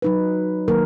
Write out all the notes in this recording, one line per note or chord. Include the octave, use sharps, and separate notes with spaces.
F#3 D#4 B4
D#3 F#3 A#3 A#4